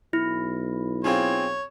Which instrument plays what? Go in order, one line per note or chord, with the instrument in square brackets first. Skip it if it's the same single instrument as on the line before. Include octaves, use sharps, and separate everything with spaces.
[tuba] B1 [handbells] E4
[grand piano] C4 F4 G#4 [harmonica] C#5